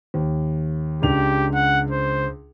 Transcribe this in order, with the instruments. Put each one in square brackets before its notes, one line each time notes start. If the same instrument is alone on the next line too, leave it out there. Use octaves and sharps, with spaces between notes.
[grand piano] D#2
[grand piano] C#2 D4 F7 [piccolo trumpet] G4
[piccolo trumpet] F#5
C5